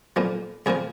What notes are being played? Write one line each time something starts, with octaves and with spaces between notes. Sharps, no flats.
B1 A#2 F3
C2 A#2 F3 G#4